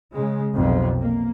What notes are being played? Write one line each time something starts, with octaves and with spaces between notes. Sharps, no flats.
C#3 G#3
B1 F2 C3
A#3